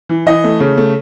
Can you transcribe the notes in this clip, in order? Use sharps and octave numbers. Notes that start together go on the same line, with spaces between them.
E3
E3 D#5
A3
C#3
A3